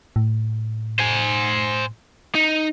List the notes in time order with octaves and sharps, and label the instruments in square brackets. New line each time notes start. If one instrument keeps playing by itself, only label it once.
[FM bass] A2
[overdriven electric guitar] C5 G#5
D#4